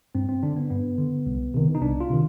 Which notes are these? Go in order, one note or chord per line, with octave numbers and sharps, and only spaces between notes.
G2 C4
C4
D3 D4
B3
G2 B3
D3
C2
C3 D#3
D#4
C2 D4
F4
C3 D#3